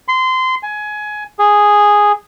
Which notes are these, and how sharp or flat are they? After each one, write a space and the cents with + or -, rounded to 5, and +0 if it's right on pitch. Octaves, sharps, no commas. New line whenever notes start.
C6 -20
G#5 +20
G#4 -5